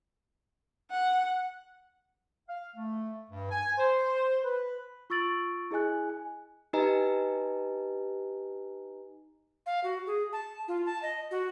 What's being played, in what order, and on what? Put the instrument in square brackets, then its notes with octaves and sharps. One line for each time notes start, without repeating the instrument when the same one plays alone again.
[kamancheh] F#5
[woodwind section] F5
A3
G2
G#5
C5
B4
[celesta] F4 C#6 E6 A6 D7 F#7
E4 G#4 D#5 G#5 F#6
G#5
[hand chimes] D#4 G4 B4 D#5 G#5 A#5
[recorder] F5
F#4
G#4
A5
F4
A5
D#5
F#4